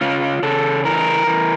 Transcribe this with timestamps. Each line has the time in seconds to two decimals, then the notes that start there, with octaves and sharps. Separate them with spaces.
0.01 C#3 F4
0.43 C#3 A4
0.84 E3 A#4
1.27 E3